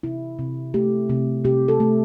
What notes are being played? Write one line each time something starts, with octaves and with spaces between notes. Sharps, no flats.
C3 E4
C3
A3 G4
C3
C3 G4
A4
A3